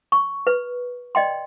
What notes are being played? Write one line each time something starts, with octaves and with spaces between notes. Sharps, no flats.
C#6
B4
D5 D#5 G5 C6